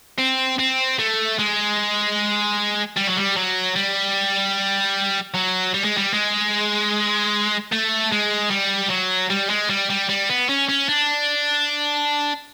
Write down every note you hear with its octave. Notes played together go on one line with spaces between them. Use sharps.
C4
C4
A3
G#3
G3
F#3
G3
F#3
G3
F#3
G3
G#3
G3
G#3
A3
G#3
G3
F#3
G3
G#3
G3
G3
G3
B3
C#4
C#4
D4